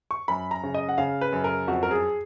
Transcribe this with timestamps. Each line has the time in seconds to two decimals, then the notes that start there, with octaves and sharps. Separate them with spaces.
0.11 C#6
0.28 F#2 B5
0.51 A#5
0.63 C#3
0.74 D#5
0.89 F#5
0.98 C#3 F5
1.21 B4
1.33 F#2
1.44 A#4
1.68 F2 F#4
1.83 A#4
1.91 G#4